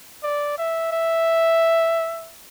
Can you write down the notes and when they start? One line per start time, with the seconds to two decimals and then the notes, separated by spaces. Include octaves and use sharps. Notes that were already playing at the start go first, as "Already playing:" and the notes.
0.23 D5
0.58 E5
0.92 E5